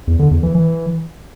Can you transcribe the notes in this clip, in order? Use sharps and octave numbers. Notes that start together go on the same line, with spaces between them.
E2
D3
E2
E3
E3